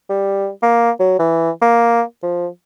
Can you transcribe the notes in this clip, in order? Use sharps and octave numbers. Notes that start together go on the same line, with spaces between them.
G3
A#3
F#3
E3
A#3
F3